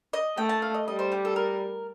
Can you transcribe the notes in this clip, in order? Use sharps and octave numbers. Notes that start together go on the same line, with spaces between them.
D#5
A3 G5
A5
F5
D#5
G3 D#5
C5
G4
A4
A#4